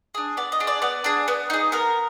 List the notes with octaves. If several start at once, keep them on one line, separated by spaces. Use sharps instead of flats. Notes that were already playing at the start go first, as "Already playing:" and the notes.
D4 G#4
B3 D5
D#5
D4 G#4
D5
B3 D5
D4 G#4
B3
D#4 G#4
B3 A#4